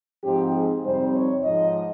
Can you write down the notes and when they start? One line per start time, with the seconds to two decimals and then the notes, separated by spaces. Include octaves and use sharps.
0.24 G#2 F3 C4 D#4 G4
0.54 G#4
0.83 F2 C3 G3 C4 D#4 C5
1.13 C#5
1.43 G#2 F3 G#3 D#4 D#5